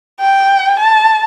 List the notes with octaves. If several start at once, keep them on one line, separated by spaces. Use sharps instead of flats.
G5
A5